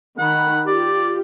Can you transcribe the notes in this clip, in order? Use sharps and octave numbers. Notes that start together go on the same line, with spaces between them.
D#3 F#5 B5
F4 G4 D5